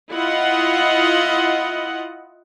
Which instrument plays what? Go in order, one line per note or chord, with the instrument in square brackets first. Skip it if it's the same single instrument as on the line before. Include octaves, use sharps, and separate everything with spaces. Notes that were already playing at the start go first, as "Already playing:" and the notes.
[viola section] E4 F4 D#5 F#5